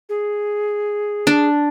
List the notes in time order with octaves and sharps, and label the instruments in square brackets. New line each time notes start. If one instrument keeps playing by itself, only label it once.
[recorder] G#4
[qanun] D4